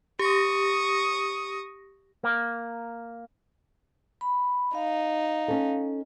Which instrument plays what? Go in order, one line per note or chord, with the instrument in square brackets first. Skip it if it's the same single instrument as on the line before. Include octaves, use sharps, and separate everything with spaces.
[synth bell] G4 A#6 [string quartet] C#6 D#6
[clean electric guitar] A#3
[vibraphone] B5
[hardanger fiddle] D#4 [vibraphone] F5
[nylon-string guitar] C#4 A4